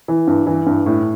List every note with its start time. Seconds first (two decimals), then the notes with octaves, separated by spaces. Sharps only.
0.08 E3
0.27 G2
0.47 E3
0.67 G2
0.86 A2